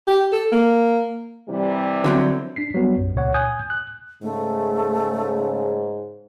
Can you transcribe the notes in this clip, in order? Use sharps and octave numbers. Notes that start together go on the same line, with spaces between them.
G4
A4
A#3
C3 E3 G3
D3 F#3 C4
D4 B6 C7
F#3 G3 B3
B1 F#2
C#2 A#2 C#3 C#5 F#5
G#5 D#6 F#6 G6
F#6
G#2 C#3 A3